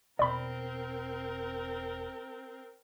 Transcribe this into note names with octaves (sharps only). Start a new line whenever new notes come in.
E1 C4 A#4 D5 B5